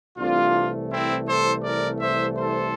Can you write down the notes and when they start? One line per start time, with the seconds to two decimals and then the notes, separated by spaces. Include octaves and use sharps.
0.18 C2 C3 E3 A3 D4 F4
0.91 C4 E4
1.28 A4 C5
1.64 A#4 D5
2.01 C5 E5
2.37 A4 C5